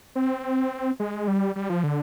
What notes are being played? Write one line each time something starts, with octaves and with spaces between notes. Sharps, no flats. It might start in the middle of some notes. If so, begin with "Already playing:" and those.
C4
G#3
G3
G3
F3
D3